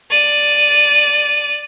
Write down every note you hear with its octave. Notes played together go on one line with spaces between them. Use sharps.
D5 D#7